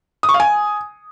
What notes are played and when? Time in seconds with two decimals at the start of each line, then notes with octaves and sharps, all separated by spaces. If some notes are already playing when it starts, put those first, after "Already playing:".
0.23 D#6
0.29 C#6
0.34 F5
0.40 G#5